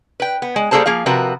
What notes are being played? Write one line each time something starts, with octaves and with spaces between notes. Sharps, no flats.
B4 G5
B3
G#3
G3 A#3 G#4 A4 C5 A5
F3 A#3 G#4 F5
C3 F3 F#4 A#4 B4